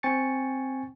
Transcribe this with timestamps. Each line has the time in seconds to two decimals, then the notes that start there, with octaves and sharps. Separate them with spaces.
0.03 C4 G5 G#5 C#6 A6 C#7